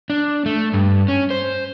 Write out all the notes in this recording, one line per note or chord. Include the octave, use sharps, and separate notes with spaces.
D4
A3
G2
C#4
C5